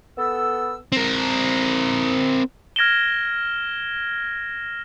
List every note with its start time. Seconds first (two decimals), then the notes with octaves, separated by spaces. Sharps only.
0.18 B3 A4 E6
0.92 C4 A#4
2.76 F6 G#6 A#6 D7 E7 G7